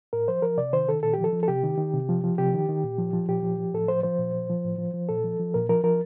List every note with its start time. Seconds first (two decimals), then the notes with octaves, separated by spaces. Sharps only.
0.13 A2 A#4
0.28 F3 C5
0.42 F3 A#4
0.58 C3 D5
0.73 D#3 C5
0.89 D#3 A4
1.03 A#2 A4
1.13 F3 G4
1.24 A4
1.33 F3
1.43 A4
1.48 C3 G4
1.64 D#3
1.78 D#3
1.94 C3
2.09 F3
2.24 F3
2.38 C3 G4
2.54 D#3
2.69 D#3
2.83 A#2
2.98 F3
3.13 F3
3.28 A#2 G4
3.43 F3
3.59 F3
3.74 A2 A4
3.88 F3 C5
4.03 F3 C5
4.19 A#2
4.34 F3
4.49 F3
4.64 A2
4.78 F3
4.94 F3
5.09 A#2 A4
5.24 F3
5.39 F3
5.54 A#2 A#4
5.69 F3 A#4
5.84 F3 A#4